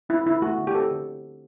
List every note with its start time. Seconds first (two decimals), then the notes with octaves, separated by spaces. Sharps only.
0.09 C4 E4
0.25 D3 E4
0.42 A3 F#4
0.58 D3
0.67 G4
0.74 C4 A4
0.91 D3